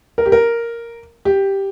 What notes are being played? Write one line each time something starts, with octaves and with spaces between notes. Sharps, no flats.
A#4
G4
A#4
G4